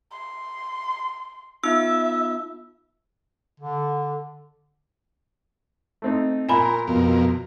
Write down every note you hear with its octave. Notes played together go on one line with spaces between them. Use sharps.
C6
B3 D#4 F4 E5 E6
D3
A3 C4 D#4
A#2 A#4 G#5 A#5 B5
F2 B2 A#4